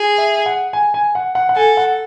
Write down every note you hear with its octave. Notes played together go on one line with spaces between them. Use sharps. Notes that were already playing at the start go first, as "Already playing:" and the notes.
Already playing: G#4
E5
F#5
G#5
G#5
F#5
F#5
F#5
A4 G#5
F#5